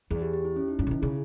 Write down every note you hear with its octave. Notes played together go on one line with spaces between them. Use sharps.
E2 G#4
G4
G4
E4
C#4
D#4
G2 C#4
C#3
D#3 E4
C#3 G#4